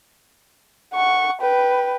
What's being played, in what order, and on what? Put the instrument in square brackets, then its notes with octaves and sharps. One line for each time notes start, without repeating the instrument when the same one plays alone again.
[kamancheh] F#5 C#6
B4 G5